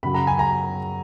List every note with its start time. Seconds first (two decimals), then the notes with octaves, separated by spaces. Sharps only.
0.03 F#2 C#3 F#3 B5
0.14 A#5
0.27 G#5
0.39 A#5